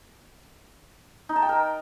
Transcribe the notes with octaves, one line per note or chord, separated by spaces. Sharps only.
D#4
A5
G5
A#4